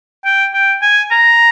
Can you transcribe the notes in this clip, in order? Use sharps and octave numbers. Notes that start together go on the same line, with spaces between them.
G5
G5
G#5
A#5